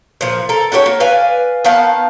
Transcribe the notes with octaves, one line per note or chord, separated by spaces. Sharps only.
A#2 F3
A4 A#4
D4 F#4 G4 C#5
A#3
B4 D5 F5 G#5
D#3 B3 F5 A5